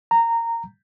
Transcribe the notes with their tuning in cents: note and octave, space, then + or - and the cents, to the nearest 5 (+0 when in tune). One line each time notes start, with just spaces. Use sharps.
A#5 -15